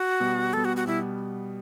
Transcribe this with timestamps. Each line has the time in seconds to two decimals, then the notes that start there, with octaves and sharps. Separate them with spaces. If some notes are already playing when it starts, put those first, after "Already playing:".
Already playing: F#4
0.20 B2 G3 B3
0.53 B2 G3 B3 A4
0.65 F#4
0.76 F#4
0.87 B2 G3 B3 E4